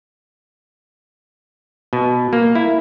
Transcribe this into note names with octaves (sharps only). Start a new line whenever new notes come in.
B2
A#3
E4